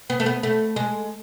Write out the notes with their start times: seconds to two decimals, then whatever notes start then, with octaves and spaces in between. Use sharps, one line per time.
0.10 B3
0.20 A3
0.26 B3
0.43 A3
0.76 G#3